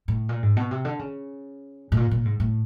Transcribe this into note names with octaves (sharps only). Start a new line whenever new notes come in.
A2
A#2
G#2
B2
C3
D3
C#3
A2
A#2
A#2
G#2
A2